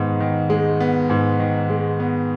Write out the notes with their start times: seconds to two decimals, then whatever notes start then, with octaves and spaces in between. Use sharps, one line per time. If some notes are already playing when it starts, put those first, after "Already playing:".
Already playing: G#2 D#3 B3
0.20 D#3
0.50 G#3
0.80 B3
1.10 G#2
1.39 D#3
1.70 G#3
2.00 B3